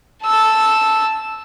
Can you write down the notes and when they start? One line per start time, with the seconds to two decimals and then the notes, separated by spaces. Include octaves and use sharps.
0.23 A5 E6